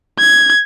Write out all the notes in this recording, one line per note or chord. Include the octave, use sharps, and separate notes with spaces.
G#6